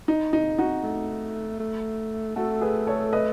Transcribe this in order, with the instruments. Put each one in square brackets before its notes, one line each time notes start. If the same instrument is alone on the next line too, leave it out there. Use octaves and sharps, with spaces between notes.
[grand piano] D#4
D#4
D#4 F#4
[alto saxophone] A3
A3
[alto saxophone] A3 [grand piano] F#4 A4
[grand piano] G#4 B4
A4 C#5
B4 D#5